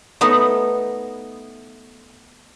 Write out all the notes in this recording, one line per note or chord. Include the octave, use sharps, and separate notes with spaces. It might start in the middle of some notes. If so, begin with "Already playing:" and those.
A3 B3 D#4